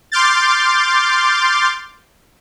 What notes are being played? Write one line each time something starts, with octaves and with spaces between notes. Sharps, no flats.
C6 D6 F6 G6 A6